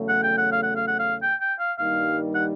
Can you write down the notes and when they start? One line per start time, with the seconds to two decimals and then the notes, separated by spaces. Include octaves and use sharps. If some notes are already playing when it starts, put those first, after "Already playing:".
Already playing: E2 C#3 F#3 A3
0.09 F#5
0.23 G5
0.38 F#5
0.52 F5
0.63 F#5
0.76 F5
0.87 F#5
0.99 F5
1.22 G5
1.41 G5
1.59 F5
1.78 G2 D#3 G3 A#3 D#4 F5
2.35 F#5